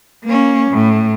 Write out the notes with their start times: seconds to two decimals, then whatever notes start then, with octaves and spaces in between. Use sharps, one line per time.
0.25 A#3 C#4
0.71 A2